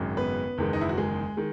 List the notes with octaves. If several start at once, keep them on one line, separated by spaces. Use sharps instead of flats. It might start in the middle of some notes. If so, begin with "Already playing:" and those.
Already playing: G#1 F#2 C#3 G#3
B3 B4
F#1 E2 D#3 G#3
D#4
E4
F#4
G#3 G#4
D#3 G#3